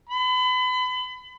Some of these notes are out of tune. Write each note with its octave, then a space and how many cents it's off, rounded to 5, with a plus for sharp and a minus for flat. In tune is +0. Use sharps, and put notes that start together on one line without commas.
B5 +35